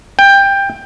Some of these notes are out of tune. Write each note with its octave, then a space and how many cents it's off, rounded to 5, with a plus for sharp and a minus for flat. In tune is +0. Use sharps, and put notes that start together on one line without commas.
G5 +15